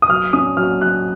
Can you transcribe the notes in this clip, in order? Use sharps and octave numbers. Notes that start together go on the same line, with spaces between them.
D#6
F#3 F6
C#4 D#6
F#3 F6
F#3 F#6